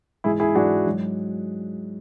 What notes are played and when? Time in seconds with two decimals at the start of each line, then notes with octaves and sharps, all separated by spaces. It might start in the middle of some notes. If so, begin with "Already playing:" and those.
0.24 G#2 E3 G#3 E4 G#4
0.40 E4 G#4
0.55 G#2 E3 G#3 D4 F#4
0.87 G#2 F#3